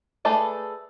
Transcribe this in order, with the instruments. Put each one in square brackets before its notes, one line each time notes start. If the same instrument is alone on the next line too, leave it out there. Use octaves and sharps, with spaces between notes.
[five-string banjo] A3 G#4 A4 B4 D5